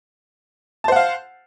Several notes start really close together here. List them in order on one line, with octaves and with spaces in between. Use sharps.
A5 C5 F#5 F5